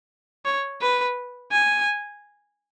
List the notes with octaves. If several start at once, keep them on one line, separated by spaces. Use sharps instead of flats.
C#5
B4
G#5